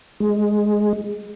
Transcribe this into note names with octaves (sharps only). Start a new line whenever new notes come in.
G#3